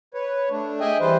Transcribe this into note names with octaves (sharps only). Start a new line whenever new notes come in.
B4 C#5
A3 D4
G#4 D#5 E5 G5 G#5
E3 G3 B4 C5